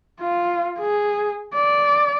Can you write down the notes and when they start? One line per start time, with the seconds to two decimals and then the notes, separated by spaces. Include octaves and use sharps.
0.20 F4
0.79 G#4
1.54 D5